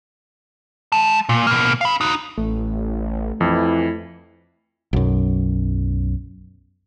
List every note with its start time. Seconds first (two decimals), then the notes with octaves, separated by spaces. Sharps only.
0.92 G#3 A5
1.29 A#2
1.47 B2 A#3
1.81 F5 B5
2.01 D#4 F#4
2.38 A1 A3
3.41 F2 E3 E4
4.93 B1 F#2